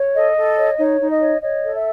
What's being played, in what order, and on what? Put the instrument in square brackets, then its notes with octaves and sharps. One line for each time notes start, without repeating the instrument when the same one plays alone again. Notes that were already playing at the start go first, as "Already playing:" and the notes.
Already playing: [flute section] C#5
A4 D#5
A4
C#5
D#4 C#5
D#4
D#5
C#5
C#5 D#5
A4
E5